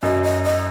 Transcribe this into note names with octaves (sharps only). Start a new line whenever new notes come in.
F#2 D#5
D#5
D#5